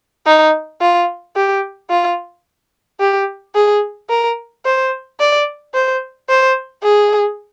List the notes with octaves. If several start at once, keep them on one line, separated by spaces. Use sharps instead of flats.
D#4
F4
G4
F4
G4
G#4
A#4
C5
D5
C5
C5
G#4